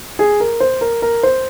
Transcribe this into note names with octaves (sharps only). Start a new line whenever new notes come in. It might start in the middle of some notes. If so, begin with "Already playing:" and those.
G#4
A#4
C5
A#4
A#4
C5